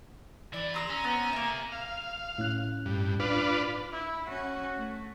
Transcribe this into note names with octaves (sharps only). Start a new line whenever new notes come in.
E3 E4 D5
A#5 C6 D#6 E6
C#4
B3 C4
C3 A#3 E5 G#5
F5
A2 C#4 F#6
G2
D4 F4 B4
E4
C#4 F#4
A3